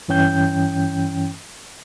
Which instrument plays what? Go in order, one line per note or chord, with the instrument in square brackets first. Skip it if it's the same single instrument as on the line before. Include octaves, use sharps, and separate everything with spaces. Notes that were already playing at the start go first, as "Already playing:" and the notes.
[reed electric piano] G2 E3 C#4 G5 G6